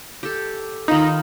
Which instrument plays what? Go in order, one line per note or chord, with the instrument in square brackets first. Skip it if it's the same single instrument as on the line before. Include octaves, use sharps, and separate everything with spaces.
[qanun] G4 A4
[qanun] D#3 F4 B5 [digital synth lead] D#4